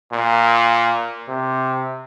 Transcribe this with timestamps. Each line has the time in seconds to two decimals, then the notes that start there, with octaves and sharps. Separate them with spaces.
0.12 A#2
1.28 C3